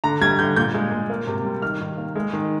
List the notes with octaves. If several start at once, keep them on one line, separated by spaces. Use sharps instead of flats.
D3 A#5
G3 G#6
D3 G6
A#2 G6
G#3
A#2
A#3
C3
G3
D#3 F6
D#3
A#3
G#3
D#3